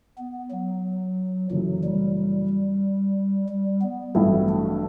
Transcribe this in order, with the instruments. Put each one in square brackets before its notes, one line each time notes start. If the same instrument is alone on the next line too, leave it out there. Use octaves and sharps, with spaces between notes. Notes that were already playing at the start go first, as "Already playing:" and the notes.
[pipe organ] B3
F#3
[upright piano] F#1 F#2 E3 A3 [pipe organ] F#3
[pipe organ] G3
G3
B3
[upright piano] A1 G2 F#3 A3 E4 [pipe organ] C4
[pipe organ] D4